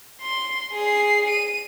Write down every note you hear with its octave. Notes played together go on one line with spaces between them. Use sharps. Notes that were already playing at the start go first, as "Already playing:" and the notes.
C6
G#4 C7
D#7